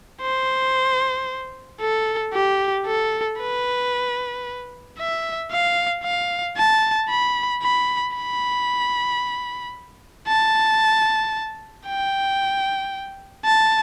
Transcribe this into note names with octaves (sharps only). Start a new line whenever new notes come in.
C5
A4
G4
A4
B4
E5
F5
F5
A5
B5
B5
B5
A5
G5
A5